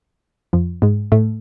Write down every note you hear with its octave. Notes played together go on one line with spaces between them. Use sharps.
F2 F3
G#2 G#3
A2 A3